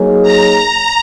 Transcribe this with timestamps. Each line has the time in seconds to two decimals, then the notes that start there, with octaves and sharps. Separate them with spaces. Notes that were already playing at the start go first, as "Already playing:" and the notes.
Already playing: F#3 A#3 D#4 G#4 C#5
0.23 A#5